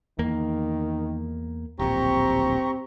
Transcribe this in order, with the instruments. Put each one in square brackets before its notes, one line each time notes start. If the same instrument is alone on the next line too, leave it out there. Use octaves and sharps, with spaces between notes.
[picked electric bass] E2 A#3 [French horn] D#3
[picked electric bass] D1 A#1 [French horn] C4 [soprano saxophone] G4 [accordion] A#5 C#6